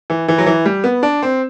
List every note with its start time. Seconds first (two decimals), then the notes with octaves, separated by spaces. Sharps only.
0.10 E3
0.28 E3
0.38 F#3
0.46 E3
0.65 G3
0.84 B3
1.03 D4
1.22 C4